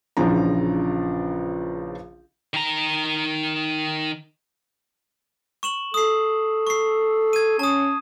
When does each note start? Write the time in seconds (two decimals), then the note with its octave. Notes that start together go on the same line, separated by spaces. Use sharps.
0.17 A#1 C#3 E3 F3 D4 A#5
2.54 D#3 A#5
5.63 C#6 E7 F#7
5.94 A4 D#6 C7
6.67 C#6 C7
7.33 G#6 D#7
7.59 C#4 A5 D#6